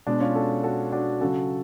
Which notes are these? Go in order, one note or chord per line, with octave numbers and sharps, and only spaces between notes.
B2 G#3 D4
C#4 F4
F#4 A4
F#4 A4
D4 F#4
C#3 F#3 F#4 A4